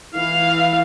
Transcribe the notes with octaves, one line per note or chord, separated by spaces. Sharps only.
E3 F5